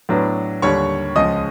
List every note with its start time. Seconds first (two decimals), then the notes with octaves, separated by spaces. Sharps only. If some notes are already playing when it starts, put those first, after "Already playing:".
0.09 A2 F#3 B3 D4
0.62 D#2 D3 G3 C#5 C#6
1.16 C#2 C#3 F3 G#3 D#5 D#6